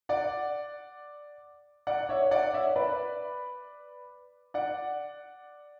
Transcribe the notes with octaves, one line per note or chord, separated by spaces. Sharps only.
D5 F#5
D5 F#5
C#5 E5
D5 F#5
C#5 E5
B4 D5
D5 F#5